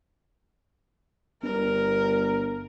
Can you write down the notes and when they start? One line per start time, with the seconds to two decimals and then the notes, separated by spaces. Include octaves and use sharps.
1.43 G1 A#4